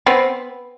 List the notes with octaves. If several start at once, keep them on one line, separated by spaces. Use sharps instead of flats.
B3 C4